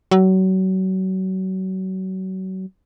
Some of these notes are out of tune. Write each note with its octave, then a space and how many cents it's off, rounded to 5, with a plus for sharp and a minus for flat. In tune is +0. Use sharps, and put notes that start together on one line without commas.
F#3 +30